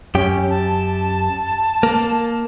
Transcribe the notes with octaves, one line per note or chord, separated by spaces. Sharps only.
F#2 C#4 G4
A5
A#3